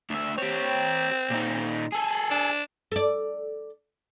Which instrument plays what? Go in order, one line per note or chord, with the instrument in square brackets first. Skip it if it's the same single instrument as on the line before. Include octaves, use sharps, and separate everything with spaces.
[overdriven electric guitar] D2 E5
[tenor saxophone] C4 [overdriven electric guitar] G4 C#5
[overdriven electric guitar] A#2 D#4
G#4 A4
[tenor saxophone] D4
[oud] A4 D5